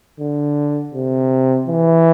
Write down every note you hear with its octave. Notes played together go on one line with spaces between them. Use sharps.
D3
C3
E3